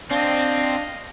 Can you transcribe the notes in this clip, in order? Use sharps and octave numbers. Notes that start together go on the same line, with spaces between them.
C4 D4 D#5 F5